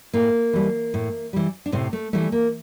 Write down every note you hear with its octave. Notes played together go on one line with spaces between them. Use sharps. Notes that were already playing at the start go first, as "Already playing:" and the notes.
A2 A#3
E3 G3
A2
E3 G3
D4
A2 C3 C4
A3
E3 G3 A3
A#3